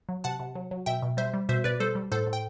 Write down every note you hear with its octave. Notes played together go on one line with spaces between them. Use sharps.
F#3
C3 F#5 A5
C3
F#3
F#3
B2 E5 G5
B2
G3 C5 E5
G3
B2 C5 E5
B2 B4 D5
G3 A4 C5
G3
A2 A4 C5
A2
G5